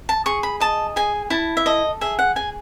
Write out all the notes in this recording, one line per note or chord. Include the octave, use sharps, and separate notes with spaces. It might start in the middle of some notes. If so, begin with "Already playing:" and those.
A5
G#4 C#6
B5
D#5 A5
G#4 G#5
E4 A5
E5
A4 D#5
G#4 E5
F#5
G#4 G#5